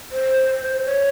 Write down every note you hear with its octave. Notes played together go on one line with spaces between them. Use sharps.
C5
C#5